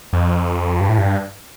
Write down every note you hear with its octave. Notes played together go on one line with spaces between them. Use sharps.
F2
G2
A2
G2